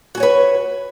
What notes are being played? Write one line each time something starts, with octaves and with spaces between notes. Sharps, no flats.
F#4 B4 C#5 G#5